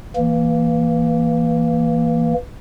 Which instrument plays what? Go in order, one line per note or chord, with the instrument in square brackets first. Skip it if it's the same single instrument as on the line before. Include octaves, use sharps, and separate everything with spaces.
[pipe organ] E3 A#3